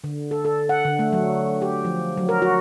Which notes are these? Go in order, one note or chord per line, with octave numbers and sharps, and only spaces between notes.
D3
A4
A4
F#5
D3
A3
F#3
G4
F3
F#3
A#4
F#4